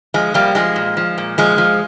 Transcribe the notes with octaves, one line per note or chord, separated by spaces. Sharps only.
F3 G#3
F3 G3 A#3
F3 G#3
A#2
F3
A#2
F3 G#3
F3